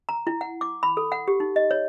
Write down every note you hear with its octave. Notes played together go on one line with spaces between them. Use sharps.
A#5
E4
F#5
D6
B5
A4
F#5
G4
D#4
D#5
C#5